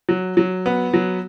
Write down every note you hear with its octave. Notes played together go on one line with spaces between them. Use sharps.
F#3
F#3
B3
F#3